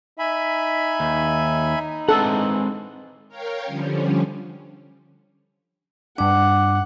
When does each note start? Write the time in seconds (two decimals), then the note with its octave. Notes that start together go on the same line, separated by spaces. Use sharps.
0.19 D#4 E5 G#5 B5
1.00 D#2
2.09 E3 G#3 C4 A4 F#5
3.29 A#4 C#5 F5 G5
3.65 D3 F3 G3 C#4
6.18 G2 D4 F#5 D6